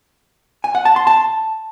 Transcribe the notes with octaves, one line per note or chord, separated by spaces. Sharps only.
G#5
F#5
A5
C6
A5